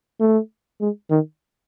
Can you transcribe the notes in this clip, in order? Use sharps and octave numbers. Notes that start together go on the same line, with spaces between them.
A3
G#3
D#3